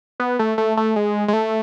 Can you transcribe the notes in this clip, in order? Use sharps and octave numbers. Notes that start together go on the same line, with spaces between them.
B3
A3
A3
A3
G#3
G#3
A3